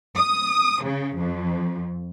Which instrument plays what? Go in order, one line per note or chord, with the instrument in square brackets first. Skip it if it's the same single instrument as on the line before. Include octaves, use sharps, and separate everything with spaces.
[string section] D#6
C#3
F2